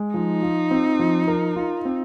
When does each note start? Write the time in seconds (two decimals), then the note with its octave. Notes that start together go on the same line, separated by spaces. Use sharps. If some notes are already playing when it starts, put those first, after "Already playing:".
Already playing: G#3
0.14 F3 D#4
0.42 F4
0.71 C4
0.99 F3
1.28 A#4
1.56 F4
1.85 C4